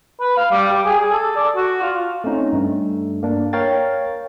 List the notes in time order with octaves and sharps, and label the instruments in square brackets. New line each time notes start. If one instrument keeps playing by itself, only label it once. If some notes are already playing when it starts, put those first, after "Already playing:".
[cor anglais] B4
F5
G3
G4
G#4
G#4
A4
D5
F#4
F4
[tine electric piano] A3 C4 C#4 D#4
G2 A3
A#3 D4
A#4 C#5 F5 G5 A6